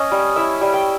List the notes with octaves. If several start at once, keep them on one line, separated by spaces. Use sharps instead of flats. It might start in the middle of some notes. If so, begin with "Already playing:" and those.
Already playing: C#4 D#5
G3
E4 E5
G3
G5